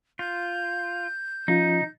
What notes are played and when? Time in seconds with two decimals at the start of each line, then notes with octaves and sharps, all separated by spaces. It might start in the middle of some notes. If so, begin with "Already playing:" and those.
0.19 F4 G6
1.48 F3 C#4 D#4 F4